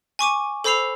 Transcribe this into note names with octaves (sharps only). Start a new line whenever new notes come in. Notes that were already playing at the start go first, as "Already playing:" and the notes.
G#5 C#6 D6 D#7
A4 C5 B5 E6 C7 F7